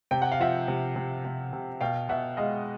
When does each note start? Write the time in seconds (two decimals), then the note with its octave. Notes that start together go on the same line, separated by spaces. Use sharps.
0.11 C3 G5
0.22 F#5
0.32 F5
0.40 F3 E5 F#5
0.68 C3
0.96 C3
1.25 C3
1.53 C3
1.81 B2 F5 G5
2.09 B2 E5 F#5
2.37 G#3 D#5 F5